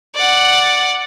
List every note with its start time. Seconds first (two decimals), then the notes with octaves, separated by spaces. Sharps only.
0.15 D5 F#5